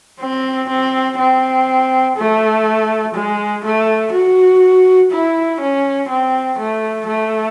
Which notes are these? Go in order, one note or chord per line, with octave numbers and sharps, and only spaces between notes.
C4
C4
C4
A3
G#3
A3
F#4
E4
C#4
C4
A3
A3